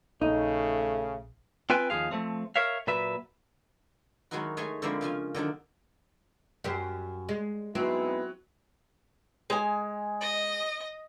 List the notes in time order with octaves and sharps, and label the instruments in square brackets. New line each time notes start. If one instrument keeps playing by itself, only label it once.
[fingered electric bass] A#1 [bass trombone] C#3 [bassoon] A3 [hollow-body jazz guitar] D#4
[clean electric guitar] C4 F4 B4 G5 G#5
D#2 B2 F3 G#4 F5
F3 A3 C4
A#4 C#5 E5 F5
A#2 F#3 B4 E5
[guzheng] D#3 F#3 G#3 D#4 E4 F#4
G#3 A3 G#4 C#5 D#5
D3 F3 G#3 A#3 C4 E4
C#3 F3 F4 G#5
D3 D#3 F#3 D4
[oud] F#2 G4 C5
G#3
[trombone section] G#2 B3 E4 [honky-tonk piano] F#3 [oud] C4
[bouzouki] G#3 G#5
[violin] D#5